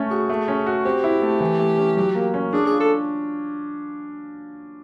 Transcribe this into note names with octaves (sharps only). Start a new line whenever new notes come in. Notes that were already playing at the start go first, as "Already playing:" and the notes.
Already playing: A3 C#4
F#4 G#4
A3
C#4
F#4
C4 G4
E4
A3
E3
A3
C#4
F#3
A#3
C#4
D4 G#4
G#4
F4
A4